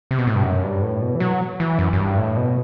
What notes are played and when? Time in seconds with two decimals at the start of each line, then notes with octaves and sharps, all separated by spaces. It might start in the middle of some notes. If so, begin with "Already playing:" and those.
0.11 C3
0.18 B2
0.27 A2
0.35 G2
0.43 F#2
0.63 G2
0.82 A2
1.01 B2
1.15 E3
1.20 F#3
1.60 E3
1.79 F#2
1.93 F#2
1.98 G2
2.18 A2
2.37 B2